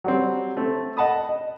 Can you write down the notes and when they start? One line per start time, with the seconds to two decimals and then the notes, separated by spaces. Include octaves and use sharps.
0.04 F#3 G3 C4
0.57 A3 C4
0.97 D#5 F#5 A5 B5 D#6
1.29 D#5